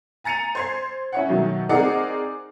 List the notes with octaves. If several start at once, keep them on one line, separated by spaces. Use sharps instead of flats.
G#5 A#5 A6 C#7 D#7 F7
C5 G#6 C7
C#4 E4 C#5 F#5
B2 D#3 F#3 A3
C4 D#4 G#4 A#4 D5 F#5